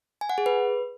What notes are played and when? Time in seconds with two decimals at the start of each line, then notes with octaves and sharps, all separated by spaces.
0.21 G#5
0.30 F#5
0.38 G#4
0.46 B4